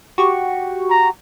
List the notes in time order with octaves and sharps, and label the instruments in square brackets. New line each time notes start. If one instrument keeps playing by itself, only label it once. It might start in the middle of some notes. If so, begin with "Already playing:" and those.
[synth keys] F#4 G4 C#6
[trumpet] A#5